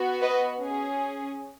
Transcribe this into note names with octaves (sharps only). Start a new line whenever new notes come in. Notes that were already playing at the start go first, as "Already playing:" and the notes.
Already playing: B3 F#4
B4 D#5
C#4 G#4